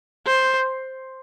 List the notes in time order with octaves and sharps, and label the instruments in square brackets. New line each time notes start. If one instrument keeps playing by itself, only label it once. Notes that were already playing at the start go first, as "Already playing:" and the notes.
[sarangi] C5